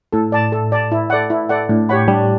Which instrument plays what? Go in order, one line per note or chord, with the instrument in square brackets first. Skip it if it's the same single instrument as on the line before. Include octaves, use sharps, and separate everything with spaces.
[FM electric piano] A2 [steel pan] A4
[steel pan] D5 A5
A4
D5 A5
E4
A4 D5 F#5
E4
A4 D5 F#5
[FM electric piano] A2 [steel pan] D4
[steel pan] G4 C#5 F#5 B5
[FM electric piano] G3 [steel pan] D4